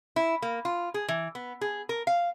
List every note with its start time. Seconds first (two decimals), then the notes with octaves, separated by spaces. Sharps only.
0.16 E4
0.42 A#3
0.65 F4
0.94 G#4
1.08 E3
1.35 B3
1.61 G#4
1.89 A#4
2.07 F5